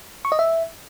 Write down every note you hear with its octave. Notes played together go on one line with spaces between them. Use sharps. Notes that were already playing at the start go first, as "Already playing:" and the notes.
C#6
D#5
E5